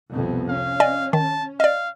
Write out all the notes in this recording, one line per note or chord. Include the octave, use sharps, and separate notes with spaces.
C2 F2 B2
C#4 F5
D5 D#5 G#5
D#3 A5
D5 D#5 F5